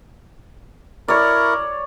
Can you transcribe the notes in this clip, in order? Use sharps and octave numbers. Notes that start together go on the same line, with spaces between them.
E4 A#4 C#5 D5